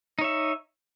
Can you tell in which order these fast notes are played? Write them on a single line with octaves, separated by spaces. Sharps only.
D#4 C#5 E5